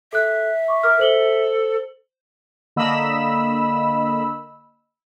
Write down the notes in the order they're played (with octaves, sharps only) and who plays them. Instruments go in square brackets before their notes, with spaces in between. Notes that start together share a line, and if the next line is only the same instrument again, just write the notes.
[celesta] A4 F#6 [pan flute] E5
[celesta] C#6 D6
[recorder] A#4 [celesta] D6 F6
[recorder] A4 [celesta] C5 F#7 G7
[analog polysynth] D3 A#3 D#5 B5 E6